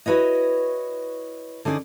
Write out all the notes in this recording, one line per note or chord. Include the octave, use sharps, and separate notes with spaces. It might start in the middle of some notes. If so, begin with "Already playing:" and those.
E4 F#4 B4 C#5 D#5
D3 C#4 D#4 G#4 D5